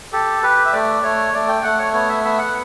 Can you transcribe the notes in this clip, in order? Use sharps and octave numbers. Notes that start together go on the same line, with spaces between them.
G4 A4
G4 B4
E5
A3 D5
A3 C#5
A3 D5
G5
A3 F#5
C#5
B3 C#5
E5
B3 E5
F#5